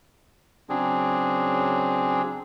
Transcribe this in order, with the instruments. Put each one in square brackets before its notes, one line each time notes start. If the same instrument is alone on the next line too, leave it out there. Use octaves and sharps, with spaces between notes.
[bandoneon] C#3 F#3 C4 D4 G#4